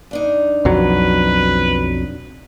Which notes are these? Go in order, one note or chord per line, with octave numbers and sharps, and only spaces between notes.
G2 D4 D#4
B1 F2 F#3 B4